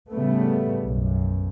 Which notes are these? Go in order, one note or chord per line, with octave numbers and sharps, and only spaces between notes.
A2 C#3 G3 A3 B3
B1 F#2